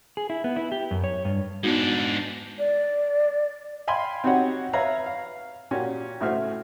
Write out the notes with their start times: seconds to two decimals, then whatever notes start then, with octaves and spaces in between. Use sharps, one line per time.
0.17 G#4
0.30 E4
0.44 B3
0.56 E4
0.72 G4
0.91 F#2
1.04 C#5
1.25 G2
1.63 G#2 B3 D4 D#4 F#4
2.59 D5
3.88 F5 G5 G#5 B5 C6
4.24 C4 D#4 F#4 G4 C#5 F#5
4.73 B4 C#5 E5 F5 A#5 B5
5.06 F5
5.71 A#2 C#4 F#4 G4
6.21 A2 C#3 A3 F#4 C5 F6